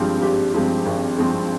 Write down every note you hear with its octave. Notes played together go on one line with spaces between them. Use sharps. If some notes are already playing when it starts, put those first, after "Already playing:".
Already playing: G#1 G2 F3 G#3 C4 G4
G#1 G4
G2 F3 G#3 C4
G#1
G2 F3 G#3 C4